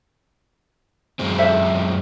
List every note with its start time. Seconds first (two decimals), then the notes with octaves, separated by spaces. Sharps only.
1.19 F#2 G#3 C4
1.38 A4 C5 E5